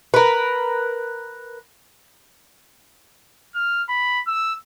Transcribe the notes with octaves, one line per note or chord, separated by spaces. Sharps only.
A#4 B4
F6
B5
E6